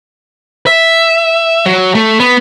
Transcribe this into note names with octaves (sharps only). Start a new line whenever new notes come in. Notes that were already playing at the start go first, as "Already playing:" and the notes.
E5
F#3
A3
B3